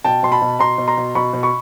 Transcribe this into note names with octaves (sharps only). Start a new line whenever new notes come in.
B2 G5 A5
B2 C6
A5 B5
B2
B2 A#5 C6
B2
A#5 C6
B2
B2 B5 C#6
B2
B5 C#6